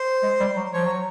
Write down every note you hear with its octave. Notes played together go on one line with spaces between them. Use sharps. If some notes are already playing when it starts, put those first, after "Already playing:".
Already playing: C5
G#3
G3
F#3
F3 C#5
F#3